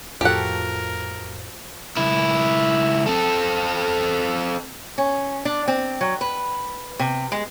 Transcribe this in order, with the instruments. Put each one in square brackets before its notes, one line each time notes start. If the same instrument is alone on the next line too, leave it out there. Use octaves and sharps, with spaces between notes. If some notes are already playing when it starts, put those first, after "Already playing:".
[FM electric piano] F2 A2 [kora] F3 F#4 A4 [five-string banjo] G4 F#5 [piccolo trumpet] A#4
[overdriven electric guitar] C#2 E4
C4 A4
[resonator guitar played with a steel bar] C#4
D4
C4
F#3
B4
C3
G#3